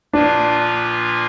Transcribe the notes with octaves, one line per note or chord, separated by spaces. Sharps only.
A#2 F3 A#3 D4 F4 B4